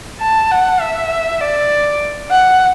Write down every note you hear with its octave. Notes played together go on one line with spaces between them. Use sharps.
A5
F#5
E5
D5
F#5